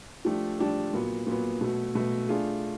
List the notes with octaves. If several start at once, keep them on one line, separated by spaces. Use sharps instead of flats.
F3 A3 D4 G4
F3 A3 D4 G4
A#2 F#3 B3
A#2 F#3 B3
B2 F#3 A3
B2 F#3 A3
A3 D4 F4 G#4